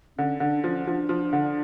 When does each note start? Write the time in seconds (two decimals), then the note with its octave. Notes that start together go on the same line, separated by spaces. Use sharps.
0.17 D3 C#4
0.40 D3 D4
0.64 F3 C#4
0.87 F3 D4
1.09 F3
1.33 D3